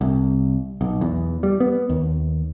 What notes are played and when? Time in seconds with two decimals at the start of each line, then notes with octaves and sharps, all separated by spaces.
0.01 C2
0.81 B1
1.01 E2
1.43 G3
1.60 B3
1.90 D#2